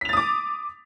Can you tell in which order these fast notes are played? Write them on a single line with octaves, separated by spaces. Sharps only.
B6 F7 A6 D#6 D6